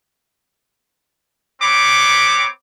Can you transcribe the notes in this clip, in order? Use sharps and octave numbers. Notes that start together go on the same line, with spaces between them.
B3 C4 C#5 B5 D6